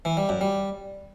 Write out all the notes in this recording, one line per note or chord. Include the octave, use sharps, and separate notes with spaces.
E3
G3
F#2
G3